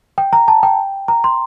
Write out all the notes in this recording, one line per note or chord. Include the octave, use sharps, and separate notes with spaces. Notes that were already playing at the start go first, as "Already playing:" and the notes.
G5
A#5
A5
G5
A#5
C6